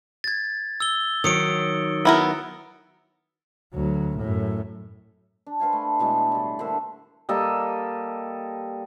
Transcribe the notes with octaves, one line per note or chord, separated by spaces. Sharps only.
G#6 A6
E6 G7
D#3 F#3 D#6 C#7 D7
B3 E4 A#4
D2 F#3
F#2 A2
D4
B4 C5 F5 G#5
A3
B2 E3 G#3 A3
A2 G3
D3 A#3 C5 E5
G3 A#3 A4 D#5